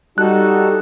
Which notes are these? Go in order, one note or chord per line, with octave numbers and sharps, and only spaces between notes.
G3 D#4 F#4 A4 F#6